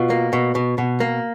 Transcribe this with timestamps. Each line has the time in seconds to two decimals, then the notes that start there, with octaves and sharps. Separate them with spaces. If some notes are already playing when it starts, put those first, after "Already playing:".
Already playing: B2 F4
0.10 A#3
0.33 B2
0.55 B2
0.78 B2
1.00 A#3